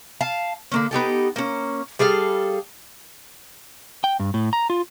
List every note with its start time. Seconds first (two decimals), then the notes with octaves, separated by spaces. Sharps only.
0.21 F5 A5
0.72 D3 A#3 C#4
0.91 B3 D#4 G4 A4
1.36 A#3 C#4
1.99 G3 G#4 A4 F5
4.04 G5
4.20 G2
4.34 A2
4.53 A#5
4.70 F4